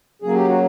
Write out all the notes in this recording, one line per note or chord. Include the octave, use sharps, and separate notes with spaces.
C#3 F#3 A#3 G#4
G4
F#4